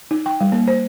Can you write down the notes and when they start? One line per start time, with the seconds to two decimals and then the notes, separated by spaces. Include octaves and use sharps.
0.11 D#4
0.26 G5
0.41 G3
0.52 A#3
0.68 C5